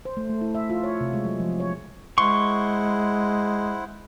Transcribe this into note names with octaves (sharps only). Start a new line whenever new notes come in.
C5
A3
A3
E4
E5
F4
C#5
C3
G#3
F#3
F3
C#5
G#3 E4 C5 F#5 C6 C#6